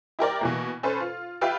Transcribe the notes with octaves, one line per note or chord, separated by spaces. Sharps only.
E4 G4 A#4 D5
B2 E3 A#3
C#4 A4 B4 C5
F4
F4 G4 B4 E5 F5 G5